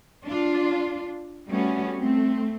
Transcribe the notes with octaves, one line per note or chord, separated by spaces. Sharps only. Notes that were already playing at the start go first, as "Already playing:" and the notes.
D4 F4
G3 A3 B3 C#4 F#4
A3 C4